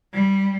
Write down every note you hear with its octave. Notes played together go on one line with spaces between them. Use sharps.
G3